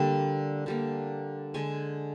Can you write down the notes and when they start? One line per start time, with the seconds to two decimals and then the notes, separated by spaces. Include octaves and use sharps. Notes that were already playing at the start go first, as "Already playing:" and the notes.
Already playing: D3 G3 A#3
0.66 D3 G3 A#3
1.54 D3 G#3 G#5